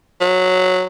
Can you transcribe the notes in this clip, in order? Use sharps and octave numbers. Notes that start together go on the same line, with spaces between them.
F#3